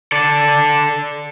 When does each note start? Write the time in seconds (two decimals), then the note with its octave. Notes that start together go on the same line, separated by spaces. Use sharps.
0.12 A4 D5